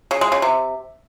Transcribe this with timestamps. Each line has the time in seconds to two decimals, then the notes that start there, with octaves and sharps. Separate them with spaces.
0.11 C#3
0.21 G#3
0.32 C#3
0.42 C3